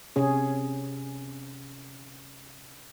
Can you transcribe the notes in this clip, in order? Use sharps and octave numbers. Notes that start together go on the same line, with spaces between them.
C3 C#4 G#4